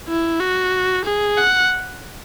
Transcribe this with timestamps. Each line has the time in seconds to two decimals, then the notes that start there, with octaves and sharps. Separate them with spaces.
0.08 E4
0.40 F#4
1.05 G#4
1.37 F#5